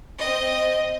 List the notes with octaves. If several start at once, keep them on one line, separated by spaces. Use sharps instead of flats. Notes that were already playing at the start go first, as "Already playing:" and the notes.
C4 D#5